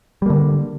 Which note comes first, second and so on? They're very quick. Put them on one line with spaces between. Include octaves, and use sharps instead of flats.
G3 A#3 D3